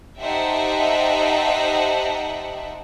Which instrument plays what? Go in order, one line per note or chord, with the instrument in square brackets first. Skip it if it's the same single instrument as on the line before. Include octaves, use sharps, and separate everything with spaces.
[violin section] D#4 G4 C5 E5 F#5 A5